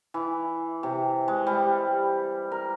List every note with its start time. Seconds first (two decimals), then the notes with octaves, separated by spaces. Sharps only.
0.14 E3
0.83 C3
1.28 G#3
1.47 G3
2.52 A#4